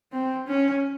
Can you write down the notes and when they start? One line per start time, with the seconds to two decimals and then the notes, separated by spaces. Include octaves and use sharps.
0.13 C4
0.47 C#4